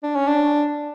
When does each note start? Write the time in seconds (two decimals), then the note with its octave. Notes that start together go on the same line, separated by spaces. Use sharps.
0.03 D4
0.15 C#4
0.27 D4